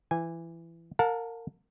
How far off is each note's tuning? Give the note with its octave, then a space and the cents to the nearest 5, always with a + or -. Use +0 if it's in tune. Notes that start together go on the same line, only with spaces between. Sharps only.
E3 +20 G#5 -15
A#4 -25 F5 +45 A5 +0